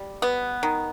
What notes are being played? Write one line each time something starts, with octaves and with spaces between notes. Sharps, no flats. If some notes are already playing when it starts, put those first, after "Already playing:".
Already playing: G3
B3
D#3